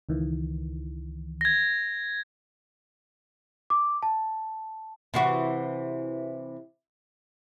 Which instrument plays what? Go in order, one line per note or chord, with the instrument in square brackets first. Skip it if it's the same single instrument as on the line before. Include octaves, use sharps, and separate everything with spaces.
[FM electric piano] C#2 D#3 E3
[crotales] G#6 A#6
[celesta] D6
A5
[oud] C3 E3 F#4